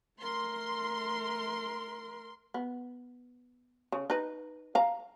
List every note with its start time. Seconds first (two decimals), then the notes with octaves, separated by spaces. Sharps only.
0.20 A3 A#4 C6
2.54 B3
3.92 C#3
4.10 D#4 B4
4.75 F5 A#5